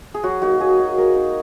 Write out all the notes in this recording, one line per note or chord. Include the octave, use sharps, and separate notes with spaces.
G#4
F#3 F#4
A#3 D#4 F#4
F#3 G#4
A#3 D#4
G#3 A#4
D#4